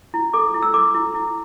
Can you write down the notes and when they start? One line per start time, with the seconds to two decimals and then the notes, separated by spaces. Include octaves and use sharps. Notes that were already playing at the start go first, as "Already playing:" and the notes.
0.14 E4
0.33 A4 D6
0.54 E4
0.62 E6
0.74 A4 D6
0.94 E4
1.14 E4